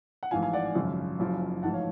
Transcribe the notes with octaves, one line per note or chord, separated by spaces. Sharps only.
F#5
A1 G#2 F3 F5 G#5
F5 G#5
D5 F#5
G#1 F#2 C#3 F3
F#1 F#2 C#3 F3
A1 G#2 F3 F#5 A5
C#5 F5